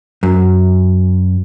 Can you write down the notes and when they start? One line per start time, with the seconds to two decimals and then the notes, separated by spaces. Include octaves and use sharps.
0.23 F#2